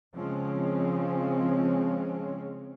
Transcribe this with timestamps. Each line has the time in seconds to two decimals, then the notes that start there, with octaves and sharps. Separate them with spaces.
0.15 C#3 F3 G#3 C4 C#4